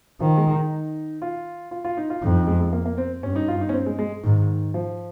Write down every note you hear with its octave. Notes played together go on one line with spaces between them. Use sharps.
D#3 F3
G#3
D#4
F4
F4
F4
D#4
F4
F2 D#4
D#4
G#3
G#3
A#3
A#3
C4
G2 C#4
D#4
F4
D#4
C#4
C4
G#3
G#3
G#2 D#3
F3